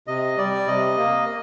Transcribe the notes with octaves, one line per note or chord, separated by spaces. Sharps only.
C3 D#5
G3 D5
C3 D#5
A#3